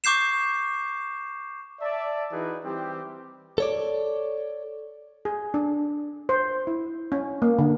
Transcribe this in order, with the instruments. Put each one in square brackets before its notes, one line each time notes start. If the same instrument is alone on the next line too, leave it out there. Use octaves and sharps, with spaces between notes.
[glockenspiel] C#6 D6 G6 C7 E7
[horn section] D5 E5 A5
E3 D#4 F#4 G#4 B4
E3 G3 C4 G4
[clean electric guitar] A4 C#5 D5
[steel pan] G#4
D4
C5
E4
C#4
A#3
D3